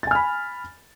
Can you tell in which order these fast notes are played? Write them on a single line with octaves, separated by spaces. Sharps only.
A6 G#5 F6 B5